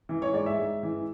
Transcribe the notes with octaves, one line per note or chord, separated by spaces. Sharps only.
E3
C#5
G#2 D5
E5
G#2
E3